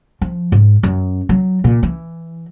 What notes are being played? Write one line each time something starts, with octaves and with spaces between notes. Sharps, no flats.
F3
G#2
F#2
F#3
A#2
E3